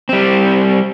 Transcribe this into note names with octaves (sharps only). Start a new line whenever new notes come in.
G3 C4